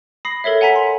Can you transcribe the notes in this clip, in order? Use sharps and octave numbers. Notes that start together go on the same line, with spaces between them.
B5 D#6 A#6 C7
A4 A#4 C#5 E5
F#5 G#5 A#5 B6
C6